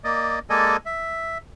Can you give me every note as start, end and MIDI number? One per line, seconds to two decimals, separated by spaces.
0.04 0.39 58
0.04 0.39 74
0.04 0.39 75
0.50 0.77 56
0.50 0.77 58
0.50 0.77 69
0.50 0.77 74
0.50 0.77 75
0.50 0.77 80
0.86 1.38 76